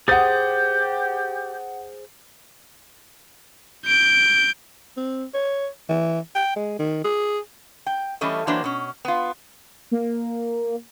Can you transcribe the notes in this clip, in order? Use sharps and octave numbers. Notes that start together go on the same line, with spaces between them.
G4 G#4 C5 F#5 D#6 A6
G6 D7
C4
C#5
E3
G5
G#3
D#3
G#4
G5
E3 G3 A3 C#4 D#5
E3 F#3 A#3 D4 C5
B2 C#4
B3 F4
A#3